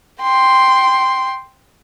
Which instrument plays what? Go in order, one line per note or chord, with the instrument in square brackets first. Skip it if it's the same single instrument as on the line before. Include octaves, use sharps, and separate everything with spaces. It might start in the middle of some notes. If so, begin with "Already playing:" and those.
[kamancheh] G5 C6